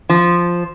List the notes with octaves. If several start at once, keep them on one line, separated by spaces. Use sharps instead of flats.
F3